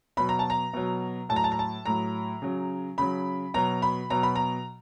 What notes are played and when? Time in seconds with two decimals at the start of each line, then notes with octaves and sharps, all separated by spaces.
0.17 B2 F#3 B5
0.29 A#5
0.39 A5
0.50 A#5
0.73 B2 F#3
1.29 A2 F#3 A5
1.36 A#5
1.44 A5
1.52 A#5
1.59 A5
1.86 A2 F#3 A#5
2.42 C#3 F#3
2.98 C#3 F#3 B5
3.54 B2 F#3 A#5
3.82 B5
4.10 B2 F#3 A#5
4.23 B5
4.36 A#5